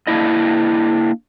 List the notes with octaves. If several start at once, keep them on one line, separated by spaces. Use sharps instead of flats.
A#3 D4 E4 D#5